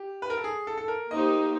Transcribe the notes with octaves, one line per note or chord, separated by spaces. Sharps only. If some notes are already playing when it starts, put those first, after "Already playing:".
Already playing: G4
B4
A#4
A4
G#4
A4
A4
A#4
A#3 D#4 G4 C5 D#5